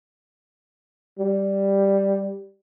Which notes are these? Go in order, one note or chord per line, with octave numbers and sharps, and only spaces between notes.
G3